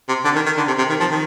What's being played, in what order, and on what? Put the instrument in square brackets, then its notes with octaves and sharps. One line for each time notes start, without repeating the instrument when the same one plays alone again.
[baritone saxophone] C3
D3
D#3
D#3
D3
C3
C3
D#3
F3
D#3